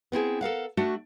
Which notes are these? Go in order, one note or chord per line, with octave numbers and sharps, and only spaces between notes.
B3 C4 E4 G#4
A4 A#4 F5 F#5
A3 D4 F#4